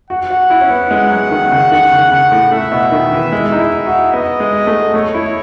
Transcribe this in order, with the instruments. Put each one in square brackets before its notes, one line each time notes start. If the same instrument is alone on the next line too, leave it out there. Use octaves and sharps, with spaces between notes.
[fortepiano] F#4 [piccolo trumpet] F#5
[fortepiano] F#4
E4
C#4
B3
G#3
F#3
D#3
C#3
[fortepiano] D#3 [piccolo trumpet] F#5
[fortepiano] C#3
[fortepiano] C#3 [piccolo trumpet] F#5
[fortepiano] A2
[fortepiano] A2 [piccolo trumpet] E5
[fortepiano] B2
D#3
E3
G#3
D#4
E4
F#4
[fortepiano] B3 [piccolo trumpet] D#5
[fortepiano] G#3
A3
[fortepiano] A3 [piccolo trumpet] C#5
[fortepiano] E4